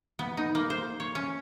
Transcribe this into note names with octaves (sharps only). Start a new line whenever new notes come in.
B3
D#4
A#3
C5
C#5
C#4